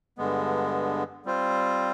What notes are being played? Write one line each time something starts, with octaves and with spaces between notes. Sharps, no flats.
G2 D3 G#3 B3
G3 C4 F4 C5